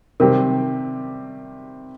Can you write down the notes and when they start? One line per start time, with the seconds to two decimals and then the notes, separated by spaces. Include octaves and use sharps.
0.20 C3 D#3 G3 C4 G4 A#4